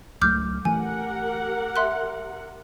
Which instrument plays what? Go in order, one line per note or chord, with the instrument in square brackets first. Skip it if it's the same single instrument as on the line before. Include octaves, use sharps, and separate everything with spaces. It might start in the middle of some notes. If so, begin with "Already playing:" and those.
[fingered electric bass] C#2 F#3 A3 [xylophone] D6 F6 G6
[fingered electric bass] E3 A3 [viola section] G4 A#4 F#5 [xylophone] G#5
[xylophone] E5 C6 F#6